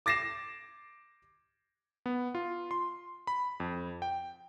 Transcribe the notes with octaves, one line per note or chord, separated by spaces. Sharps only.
D6 A6 A#6 C7 E7
B3
F4
C6
B5
F2
G5